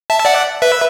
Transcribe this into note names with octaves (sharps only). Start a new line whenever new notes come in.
E5 A5
A5
D5 F#5
B4 E5